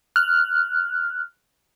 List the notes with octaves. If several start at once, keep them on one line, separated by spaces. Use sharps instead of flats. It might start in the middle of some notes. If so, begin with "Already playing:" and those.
F6 F#6